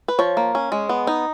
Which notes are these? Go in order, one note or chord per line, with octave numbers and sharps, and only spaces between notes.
B4
F3 C#5
A#3
C#4
G#3
B3
D#4